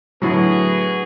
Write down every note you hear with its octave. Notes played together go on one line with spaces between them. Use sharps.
A2 D3 F#3 B3 F#4 G#4